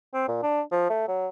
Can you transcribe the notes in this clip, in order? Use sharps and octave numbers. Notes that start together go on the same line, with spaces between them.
C4
A#2
D4
F3
A3
F#3